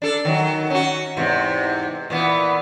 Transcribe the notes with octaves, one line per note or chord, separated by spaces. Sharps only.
D4 A4
D#3 F#3
C#4 F#4
E2 G#2 C3
A#2 E3 B3